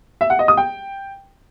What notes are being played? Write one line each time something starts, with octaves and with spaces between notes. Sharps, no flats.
E5
F#5
D#5
D#6
G5